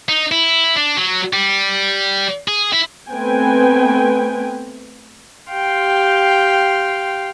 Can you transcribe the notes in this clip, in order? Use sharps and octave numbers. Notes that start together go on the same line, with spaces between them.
D#4
E4
D4
F#3
G3
G#4
E4
A3 B3 C4 B4 G5 G#5
G4 F5 G5 C6